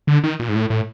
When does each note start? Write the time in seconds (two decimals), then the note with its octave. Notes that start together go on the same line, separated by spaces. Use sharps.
0.07 D3
0.23 D#3
0.40 A#2
0.49 G#2
0.55 A2
0.70 A2